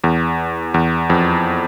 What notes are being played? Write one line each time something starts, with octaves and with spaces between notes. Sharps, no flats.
E2
E2
F2